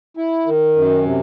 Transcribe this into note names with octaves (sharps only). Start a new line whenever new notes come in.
E4
D#3
F#2
C3